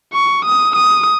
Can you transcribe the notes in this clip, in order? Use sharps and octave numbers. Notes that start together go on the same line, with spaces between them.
C#6
D#6
D#6